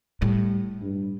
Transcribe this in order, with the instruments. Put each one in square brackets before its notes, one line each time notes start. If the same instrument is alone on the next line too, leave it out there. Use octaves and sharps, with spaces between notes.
[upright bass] A2 [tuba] G3
[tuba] G2